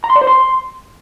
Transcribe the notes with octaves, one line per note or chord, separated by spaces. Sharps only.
A#5
C6
D5
C5
C6